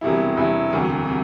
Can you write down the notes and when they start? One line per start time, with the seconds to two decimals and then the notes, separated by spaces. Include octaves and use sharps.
0.01 E1 E2 C3 G3 E4
0.36 E1 E2 C3 G3 E4
0.70 E1 D2 C3 G3
1.04 C3 G3